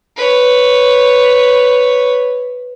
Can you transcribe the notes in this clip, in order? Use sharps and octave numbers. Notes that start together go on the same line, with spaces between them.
B4 C#5